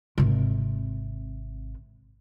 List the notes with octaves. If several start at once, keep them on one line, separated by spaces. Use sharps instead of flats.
G#1 C3